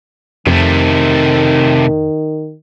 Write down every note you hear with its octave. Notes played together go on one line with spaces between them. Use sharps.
F2 C3 D#3 A3